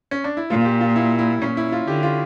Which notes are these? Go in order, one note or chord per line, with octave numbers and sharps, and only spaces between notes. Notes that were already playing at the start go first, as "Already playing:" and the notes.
C#4
D4
E4
A#2 F4
F4
G4
F4
E4
E4
A#2 C#4
E4
F4
D3 G4
F4